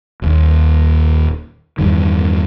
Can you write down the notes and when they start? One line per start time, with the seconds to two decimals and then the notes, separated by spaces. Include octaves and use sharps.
0.22 D#1 D#2
1.78 E2 G2 D#3